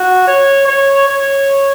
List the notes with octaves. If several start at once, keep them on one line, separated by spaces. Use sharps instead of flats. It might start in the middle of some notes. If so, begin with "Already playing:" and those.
Already playing: F#4
C#5
C#5
C#5